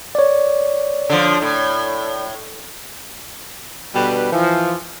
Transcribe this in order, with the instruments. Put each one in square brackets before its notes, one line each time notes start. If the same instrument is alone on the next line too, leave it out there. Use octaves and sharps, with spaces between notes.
[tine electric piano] C#5 D5
[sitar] D3 F3
A2
[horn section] B2 D3 G3 B4
E3 F3